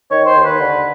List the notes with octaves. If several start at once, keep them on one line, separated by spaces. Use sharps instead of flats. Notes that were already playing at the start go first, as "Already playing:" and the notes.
D#3 C#5
C5
D#2
B4
D3